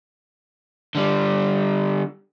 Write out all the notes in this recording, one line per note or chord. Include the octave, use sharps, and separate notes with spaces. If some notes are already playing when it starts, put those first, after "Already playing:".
D3 G3